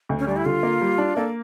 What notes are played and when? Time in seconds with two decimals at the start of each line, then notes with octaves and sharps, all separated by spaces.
0.09 D2
0.19 C#4
0.27 G3 D4
0.37 E4
0.45 D3 F4
0.63 A#3
0.81 G3
0.98 D4
1.16 A#3 A4